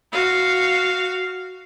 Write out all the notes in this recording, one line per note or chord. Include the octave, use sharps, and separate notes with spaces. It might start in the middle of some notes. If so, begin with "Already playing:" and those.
F#4 F5